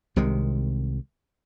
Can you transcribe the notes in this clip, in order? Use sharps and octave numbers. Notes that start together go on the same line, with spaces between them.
C2 C3 D#3 G#3